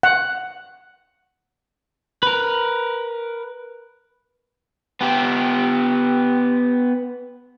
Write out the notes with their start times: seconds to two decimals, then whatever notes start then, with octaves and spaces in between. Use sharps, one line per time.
0.03 F#5
2.23 A#4 B4
5.01 B3 G4